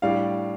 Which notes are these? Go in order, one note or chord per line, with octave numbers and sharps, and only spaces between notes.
A2 G3 D4 F5